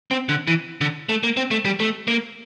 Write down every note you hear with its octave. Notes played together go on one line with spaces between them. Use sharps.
C4
D3
E3
D3
A3
A#3
C4
A3
G3
A3
A#3